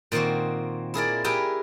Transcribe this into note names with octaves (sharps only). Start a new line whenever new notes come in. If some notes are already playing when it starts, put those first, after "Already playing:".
A#2 D#3 A#3 C4 F#4
E4 G#4 A#4 D5
G4 G#4 A#4 B4 E5 G5